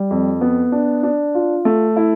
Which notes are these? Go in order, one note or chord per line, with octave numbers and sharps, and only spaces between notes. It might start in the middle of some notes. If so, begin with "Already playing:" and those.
Already playing: G3
F2
B3
D4
D4
F4
A3
E4